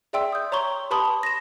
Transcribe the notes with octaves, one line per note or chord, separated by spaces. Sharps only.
G#4 D5 E5 G5 C6 E6
D#6 G6
C#5 A#5 C6 C#6 G7
G4 B4 A5 B5 C6 D#6
D#6
A#6 E7